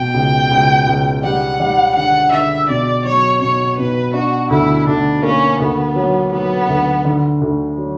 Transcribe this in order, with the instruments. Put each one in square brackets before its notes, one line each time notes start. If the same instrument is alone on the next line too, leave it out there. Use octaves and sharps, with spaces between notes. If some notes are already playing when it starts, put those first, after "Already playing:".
Already playing: [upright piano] B2 [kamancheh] G5
[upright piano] C#2
C#2
C#2
[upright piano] G3 [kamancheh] F#5
[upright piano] G3
[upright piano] D3 [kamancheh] F#5
[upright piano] D3 [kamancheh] E5
[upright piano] B2 [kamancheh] D5
[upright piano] F#3 [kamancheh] C#5
[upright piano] B2 [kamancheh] C#5
[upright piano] B2 [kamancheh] B4
[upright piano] D4 [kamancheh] F#4
[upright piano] D2 [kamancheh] E4
[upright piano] D2 [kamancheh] D4
[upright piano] A#3 [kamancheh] C#4
[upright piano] D2 [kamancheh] B3
[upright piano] F#3
[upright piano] F#3 [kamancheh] B3
[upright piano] D2
D3
D2
F#3